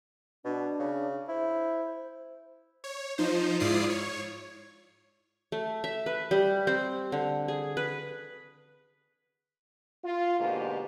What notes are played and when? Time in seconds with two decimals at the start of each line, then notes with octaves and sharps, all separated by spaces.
0.45 B2 D4
0.79 C#3
1.28 E4 C5
2.84 C#5
3.18 F3 D#4 C5
3.60 G#2 E4 F4 D5 D#6 C7
3.90 C#5
5.52 A3
5.84 E5
6.06 B4
6.31 G3
6.67 C4
7.12 D3
7.48 G#4
7.77 B4
10.04 F4
10.39 G#2 B2 D3 A#3 G4